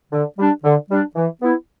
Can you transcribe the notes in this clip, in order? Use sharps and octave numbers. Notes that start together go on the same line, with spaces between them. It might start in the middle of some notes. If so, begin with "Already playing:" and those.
D3
G3 D4
D3
G3 D4
E3
B3 E4